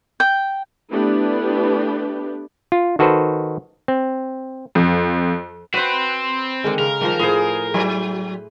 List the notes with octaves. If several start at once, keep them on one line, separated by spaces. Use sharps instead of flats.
G5
A3 B3 D4 E4 G4 B4
F4
D#3 F#4 A4 B4 C5
C4
F2
C4 F#4 B4 C5
D3 D#3 G#3
C#3 A#4
D#3 F3 G3 C5
A2 G#4 C5
F#3 E4 C5